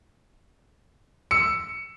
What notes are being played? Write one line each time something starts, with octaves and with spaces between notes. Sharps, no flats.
E6 C#7